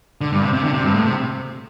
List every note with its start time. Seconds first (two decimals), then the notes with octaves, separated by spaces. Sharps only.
0.21 D3
0.32 G2
0.42 C3
0.53 C3
0.64 D3
0.73 C3
0.84 G2
0.94 A2
1.05 C3